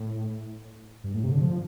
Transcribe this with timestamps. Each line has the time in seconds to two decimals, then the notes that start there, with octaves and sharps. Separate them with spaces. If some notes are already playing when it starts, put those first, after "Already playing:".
Already playing: A2
1.04 G2
1.14 A2
1.23 C3
1.32 D3
1.41 F3